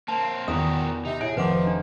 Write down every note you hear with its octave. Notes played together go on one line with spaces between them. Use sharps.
A#3 C4 A5
E2 D#3 F#4 G4 A#4 D#6
C3 D#4
A2 G#4 E5 D7
F1 D#3 F3 B4 F#5 D6
D4